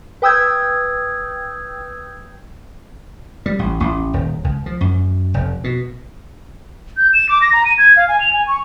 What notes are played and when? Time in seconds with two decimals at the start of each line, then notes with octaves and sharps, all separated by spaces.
0.22 B4 G5 D#6 E6 G6 G#6
3.46 G3
3.59 A1
3.80 A1
4.13 D#1
4.44 C#2
4.66 F3
4.81 F#2
5.34 F1
5.64 B2
6.97 G6
7.13 E7
7.29 D6
7.42 A#6
7.53 A#5
7.65 D#7
7.78 G#6
7.96 F5
8.08 G#5
8.20 F7
8.33 G#5
8.47 C#6